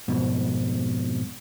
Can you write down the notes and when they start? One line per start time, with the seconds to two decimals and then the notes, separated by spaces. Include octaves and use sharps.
0.08 F2 G#2 B2